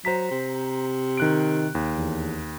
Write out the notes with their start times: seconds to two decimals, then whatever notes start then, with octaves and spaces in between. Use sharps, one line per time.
0.05 F#3 C5 A#5 B6
0.31 C3
1.17 D#3 F#6 D7
1.75 D#2
1.94 E2